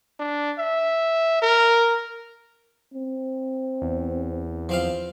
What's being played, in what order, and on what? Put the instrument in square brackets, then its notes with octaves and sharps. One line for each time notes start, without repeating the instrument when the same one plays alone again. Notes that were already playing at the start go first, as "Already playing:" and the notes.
[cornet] D4
E5
A#4
[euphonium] C4
[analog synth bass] E2
[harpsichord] F3 C4 F5